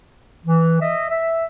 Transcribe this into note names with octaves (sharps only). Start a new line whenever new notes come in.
E3
D#5 E5
E5